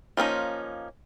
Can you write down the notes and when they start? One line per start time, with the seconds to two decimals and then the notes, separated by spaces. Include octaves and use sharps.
0.17 F3 A#3 C#4 D#4